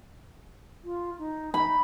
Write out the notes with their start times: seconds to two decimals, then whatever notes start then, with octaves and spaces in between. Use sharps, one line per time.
0.84 F4
1.18 D#4
1.54 D#4 B5